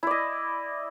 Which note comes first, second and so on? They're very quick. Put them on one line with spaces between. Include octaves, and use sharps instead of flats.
E4 D5 D#5